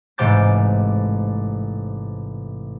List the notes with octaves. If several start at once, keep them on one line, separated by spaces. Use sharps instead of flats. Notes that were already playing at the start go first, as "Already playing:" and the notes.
A1 G#2 C3 D6 G6 A6